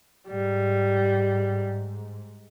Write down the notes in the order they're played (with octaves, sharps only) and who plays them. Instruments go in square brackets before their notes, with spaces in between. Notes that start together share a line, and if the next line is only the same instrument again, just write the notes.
[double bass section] G#2 [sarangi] G3